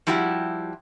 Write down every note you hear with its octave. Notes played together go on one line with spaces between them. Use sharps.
F3 G3 E4 F#4 G4